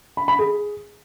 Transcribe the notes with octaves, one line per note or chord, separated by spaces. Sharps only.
B5
B5
G#4